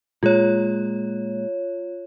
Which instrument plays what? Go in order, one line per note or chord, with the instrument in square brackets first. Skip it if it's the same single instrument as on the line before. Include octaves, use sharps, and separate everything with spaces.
[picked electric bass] A#2 G#3 [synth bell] F4 C#5